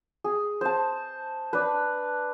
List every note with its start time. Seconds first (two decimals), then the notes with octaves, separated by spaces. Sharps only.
0.24 G#4
0.61 C5 A5
1.53 D4 B4